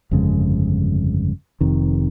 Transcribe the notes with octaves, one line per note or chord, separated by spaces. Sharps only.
G1 F2 C#3 G#3
F1 F2 C3 D#3